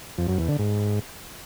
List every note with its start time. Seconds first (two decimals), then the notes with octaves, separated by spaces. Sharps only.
0.18 F2
0.28 F#2
0.38 E2
0.48 D3
0.59 G#2